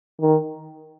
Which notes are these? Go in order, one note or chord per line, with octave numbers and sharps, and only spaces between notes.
D#3